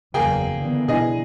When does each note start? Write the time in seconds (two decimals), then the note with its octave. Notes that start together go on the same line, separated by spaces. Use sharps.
0.14 F#1 E2 C#3 F#3 A#3 G#4 G5
0.58 D3 E3 B3
0.88 B2 D4 E4 G#4 D#5